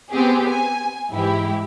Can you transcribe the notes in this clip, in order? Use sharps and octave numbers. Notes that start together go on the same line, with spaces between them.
B3 C4 G4 G#4
G#5
G#2 E3 E4 G4